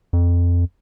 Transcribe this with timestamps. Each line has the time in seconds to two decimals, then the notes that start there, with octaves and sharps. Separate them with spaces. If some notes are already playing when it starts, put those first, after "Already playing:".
0.13 F2